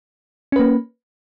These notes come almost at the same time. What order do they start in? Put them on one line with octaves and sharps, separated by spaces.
C#4 B4 A#3